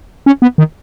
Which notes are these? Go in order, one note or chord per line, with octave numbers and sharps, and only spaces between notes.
C#4
B3
D#3